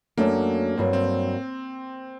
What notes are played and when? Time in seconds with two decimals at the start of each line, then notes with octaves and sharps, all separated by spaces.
0.17 F#2 F#3 A3 A#3 D4
0.77 G2 F#3 A#3 C4
0.93 C4